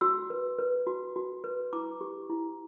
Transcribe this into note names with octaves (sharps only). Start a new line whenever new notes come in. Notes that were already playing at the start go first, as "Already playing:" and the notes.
F#4 E6
B4
B4
F#4
F#4
B4
E4 D6
G4
E4